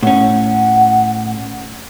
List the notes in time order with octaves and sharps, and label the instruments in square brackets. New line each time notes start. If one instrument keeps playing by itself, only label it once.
[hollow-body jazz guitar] A2 C#4 [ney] F#5